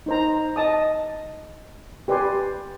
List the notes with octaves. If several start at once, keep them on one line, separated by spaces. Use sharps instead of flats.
D#4 C5 A#5
D#5 A5 D#6
G4 B4 D5 G#5 C6